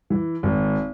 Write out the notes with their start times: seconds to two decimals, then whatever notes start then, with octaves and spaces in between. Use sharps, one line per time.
0.10 E3
0.43 G#1